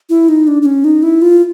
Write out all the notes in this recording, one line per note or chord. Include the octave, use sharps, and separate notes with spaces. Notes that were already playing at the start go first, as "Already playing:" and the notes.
E4
D#4
D4
D4
C#4
D#4
E4
F4